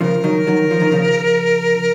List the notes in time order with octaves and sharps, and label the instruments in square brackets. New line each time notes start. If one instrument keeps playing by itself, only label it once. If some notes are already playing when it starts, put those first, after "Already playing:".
[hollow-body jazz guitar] C#3 F3 [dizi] A#4
[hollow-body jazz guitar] D#3 F#3
D#3 F#3
F3
D#3
C#3 F3